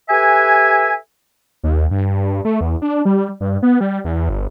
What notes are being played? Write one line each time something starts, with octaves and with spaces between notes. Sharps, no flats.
G4 A4 B4 E5 G#5
D#2
G2
A3
E2
D4
G3
G2
B3
G3
E2
G1